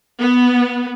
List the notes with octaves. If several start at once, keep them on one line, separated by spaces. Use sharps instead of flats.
B3